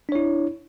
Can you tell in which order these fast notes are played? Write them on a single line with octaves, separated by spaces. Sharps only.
D4 C#5 E4